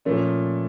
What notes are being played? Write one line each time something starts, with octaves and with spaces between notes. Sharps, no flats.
A#2 F3 A3 C#4